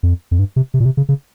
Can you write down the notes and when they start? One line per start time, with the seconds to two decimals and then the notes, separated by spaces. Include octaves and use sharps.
0.03 F2
0.31 F2
0.39 G2
0.56 C3
0.74 C3
0.80 A#2
0.85 C3
0.97 C#3
1.09 C#3